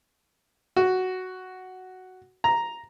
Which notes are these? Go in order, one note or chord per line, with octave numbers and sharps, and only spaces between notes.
F#4
A#5